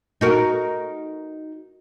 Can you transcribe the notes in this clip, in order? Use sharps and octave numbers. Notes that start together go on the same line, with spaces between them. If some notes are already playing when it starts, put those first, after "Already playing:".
D#4 F#4 A#4